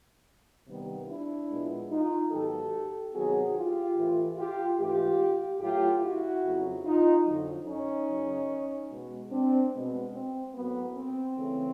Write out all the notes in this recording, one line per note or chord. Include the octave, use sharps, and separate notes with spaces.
C3 D#3 G3 B3
D4 E4
A#2 F3 G#3 B3
D#4 F4
G#2 D#3 F#3 B3 G4 A4
C3 D#3 F#3 B3 F#4 G#4
F4 G4
A2 E3 A3
F4 G4
G#2 E3 A3 F4 G4
A2 F#3 A3 F4 G4
E4 F#4
F2 C#3 F#3
D#4 F4
F2 D3 F#3
C#4 D#4
F#2 C#3 F#3
B2 G#3 B3
C4 D4
B2 G#3 B3
C4
A2 F#3 A#3 B3
C4
C#3 E3 A3